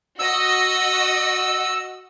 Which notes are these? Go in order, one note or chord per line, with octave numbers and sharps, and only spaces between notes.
F#4 D#5 E6